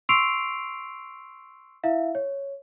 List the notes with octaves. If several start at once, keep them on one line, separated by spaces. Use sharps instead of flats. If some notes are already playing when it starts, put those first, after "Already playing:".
C6 C#6 E6 C7 D7 F7
E4 E5 F5
C#5